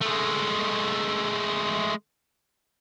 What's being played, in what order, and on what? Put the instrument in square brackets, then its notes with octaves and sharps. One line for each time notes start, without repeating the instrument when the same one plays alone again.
[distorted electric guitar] G#3 A3